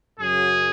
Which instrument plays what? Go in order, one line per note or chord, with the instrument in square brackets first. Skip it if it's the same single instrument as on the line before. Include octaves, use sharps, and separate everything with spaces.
[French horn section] F#2 C#3 F#3 [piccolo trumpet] G#4